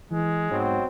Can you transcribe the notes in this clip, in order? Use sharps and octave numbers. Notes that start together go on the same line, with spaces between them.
E3 G#3
G#2 B2 F#3 C4